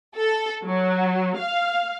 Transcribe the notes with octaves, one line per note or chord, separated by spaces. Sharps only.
A4
F#3
F5